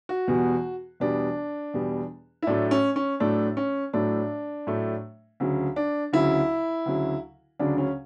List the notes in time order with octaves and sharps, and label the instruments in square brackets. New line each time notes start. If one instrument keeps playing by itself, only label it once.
[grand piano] F#4
E2 B2 G3
E2 B2 G3 D4
E2 B2 G3
E4
A2 F#3 A3 D4
C#4
C#4
A2 F#3 A3 D4
C#4
A2 F#3 A3 D4
A2 F#3 A3
D2 C#3 F#3
D4
D2 C#3 F#3 E4
D2 C#3 F#3
D2 C#3 F#3 D4
C#4